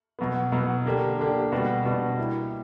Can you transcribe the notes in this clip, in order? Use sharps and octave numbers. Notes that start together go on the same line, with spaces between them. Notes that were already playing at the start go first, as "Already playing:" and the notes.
B2 F#3 B3
B2 F#3 B3
D3 A#3 D4 G4
D3 A#3 D4 G4
B2 G3 B3 D4 F#4
B2 G3 B3 D4 F#4
G3 A#3 E4